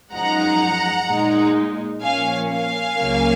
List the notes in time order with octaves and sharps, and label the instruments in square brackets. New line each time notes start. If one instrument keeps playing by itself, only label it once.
[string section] F#2 F3 G#3 D#4 F#5 A#5
A#2 G#3 D#4
A#2 F3 A#3 C#4 F5 G#5
F5 G#5
C#2 C#3 F#3 A#3 C#4